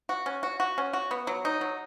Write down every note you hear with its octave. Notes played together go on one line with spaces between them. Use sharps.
F#4
C#4
F#4
F#4
C#4
F#4
B3
F#3
D#4
F#3